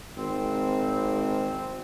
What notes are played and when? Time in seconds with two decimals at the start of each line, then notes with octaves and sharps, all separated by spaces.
0.17 G#1 C4